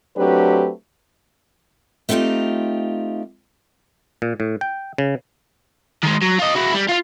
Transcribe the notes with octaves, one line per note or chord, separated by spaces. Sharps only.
F#3 A3 C4 D4 G4 B4
A3 B3 C4 D#4 F4 G4
A#2
A2
G5
C#3
D#3 G#3
F#3
F4 D#5
E4 F#4
G3
F4 F5